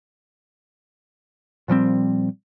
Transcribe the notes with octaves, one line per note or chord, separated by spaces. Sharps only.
A#2 F3 G3 C4